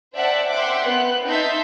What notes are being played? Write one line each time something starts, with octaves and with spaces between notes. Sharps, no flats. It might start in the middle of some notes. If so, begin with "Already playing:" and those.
C5 D5 E5 F#5 G5 A5
E5 F#5 G5 C6 D6
B3 F#6
D#4 E5 A5 C6 G6 B6